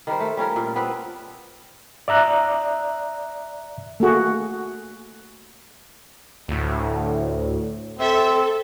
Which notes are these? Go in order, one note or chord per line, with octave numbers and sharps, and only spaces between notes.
D#3 G3 A#4 C5
A3
G3 C#4 F4 A#4
A#2
B3 C4 D4 B4
D5 E5 A#5 F#6
A3 A#3 F#4 G#4
D2 A2
C4 A4 E5